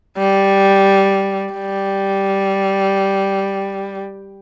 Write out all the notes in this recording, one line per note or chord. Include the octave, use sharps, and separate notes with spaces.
G3
G3